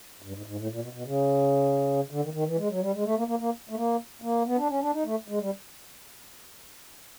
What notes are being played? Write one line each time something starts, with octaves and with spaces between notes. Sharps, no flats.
G2
G#2
G#2
A2
A#2
B2
B2
C#3
D3
D#3
D#3
E3
G#3
F#3
G3
G#3
A3
A#3
A#3
A#3
A3
A#3
A#3
B3
D4
C#4
D4
D#4
A3
G#3
G3